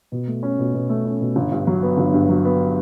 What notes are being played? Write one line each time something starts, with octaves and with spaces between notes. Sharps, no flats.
B2
A3
C#4
B2
B2
A3
C#4
B2
G1
G2
F#3
B3
G1
G2
F#3
B3